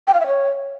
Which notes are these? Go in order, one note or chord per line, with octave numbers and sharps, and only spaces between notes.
G5
F5
E5
C#5